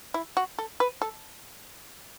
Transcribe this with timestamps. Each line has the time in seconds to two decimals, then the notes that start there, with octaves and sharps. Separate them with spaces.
0.14 E4
0.37 F#4
0.59 A4
0.80 B4
1.02 A4